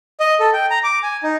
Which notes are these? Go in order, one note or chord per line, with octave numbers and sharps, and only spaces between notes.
D#5
A4
G5
A#5
D6
G#5
D#4